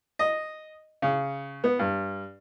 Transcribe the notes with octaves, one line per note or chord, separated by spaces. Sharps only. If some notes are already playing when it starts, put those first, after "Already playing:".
D#5
C#3
B3
G2